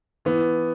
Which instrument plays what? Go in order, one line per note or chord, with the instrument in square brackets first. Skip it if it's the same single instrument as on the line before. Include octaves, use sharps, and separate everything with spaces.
[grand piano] E3 B3